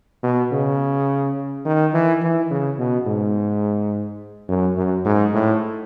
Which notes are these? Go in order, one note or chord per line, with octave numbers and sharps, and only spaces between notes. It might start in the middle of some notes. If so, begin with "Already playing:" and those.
B2
C#3
D#3
E3
E3
C#3
B2
G#2
F#2
F#2
G#2
A2